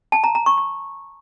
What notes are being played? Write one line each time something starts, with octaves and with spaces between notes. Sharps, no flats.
A5
A#5
A#5
C#6
C#6